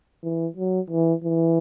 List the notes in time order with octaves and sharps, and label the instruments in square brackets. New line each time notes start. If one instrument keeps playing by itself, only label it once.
[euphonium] E3
F#3
E3
E3